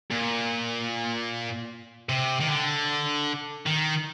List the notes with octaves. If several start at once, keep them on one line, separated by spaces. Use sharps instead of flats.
A#2
C3
D#3
D3
D#3